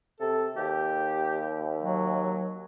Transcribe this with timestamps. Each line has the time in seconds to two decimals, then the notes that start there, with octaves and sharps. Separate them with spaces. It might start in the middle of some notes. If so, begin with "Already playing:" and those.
0.20 C3 A4
0.56 D#2 G4
1.82 F#3